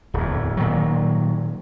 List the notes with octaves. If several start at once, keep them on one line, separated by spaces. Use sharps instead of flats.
D1 E2
A#2 D#3 F#3